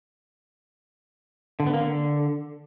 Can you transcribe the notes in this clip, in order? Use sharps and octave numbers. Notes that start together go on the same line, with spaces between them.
D3
B3
A#3
D3